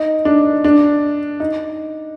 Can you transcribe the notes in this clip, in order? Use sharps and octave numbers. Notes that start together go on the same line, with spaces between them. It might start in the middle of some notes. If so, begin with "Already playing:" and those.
Already playing: D#4
D4
D4
D#4